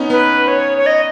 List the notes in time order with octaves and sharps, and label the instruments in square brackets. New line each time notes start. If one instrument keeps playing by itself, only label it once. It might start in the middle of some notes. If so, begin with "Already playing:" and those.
Already playing: [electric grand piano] B3 C#4 D#4
[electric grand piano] B3 [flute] B4
[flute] C#5
C#5
D#5